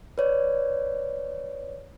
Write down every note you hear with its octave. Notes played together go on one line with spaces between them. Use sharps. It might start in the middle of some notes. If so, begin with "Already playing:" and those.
B4 C#5 D5